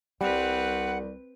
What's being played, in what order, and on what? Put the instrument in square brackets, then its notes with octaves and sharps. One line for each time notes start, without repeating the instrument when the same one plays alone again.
[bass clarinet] C2 [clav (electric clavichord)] G3 [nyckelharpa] C4 B4 [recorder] F#5